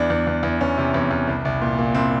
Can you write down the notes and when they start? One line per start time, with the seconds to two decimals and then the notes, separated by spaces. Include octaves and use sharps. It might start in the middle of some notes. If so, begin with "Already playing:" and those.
Already playing: E2 D4
0.10 E2
0.27 E2
0.43 E2
0.61 E2 C#4
0.78 C3
0.94 E2
1.11 E2
1.27 C2
1.45 C2
1.62 A#2
1.79 A#2
1.94 C2 C4